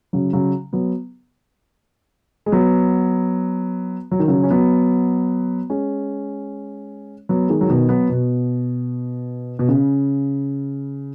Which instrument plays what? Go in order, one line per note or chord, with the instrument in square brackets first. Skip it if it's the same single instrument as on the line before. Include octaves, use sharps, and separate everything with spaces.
[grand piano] C#3 F#3
C#3 F#3
F#3 B3
G#3
F#3 B3
F#3
D#3
C#3 F#3
C#4
F#3 B3
G#3 C#4
F#3 B3
D#3 G#3
F#3
B2 D#3
F#3 B3
B2
B2
C#3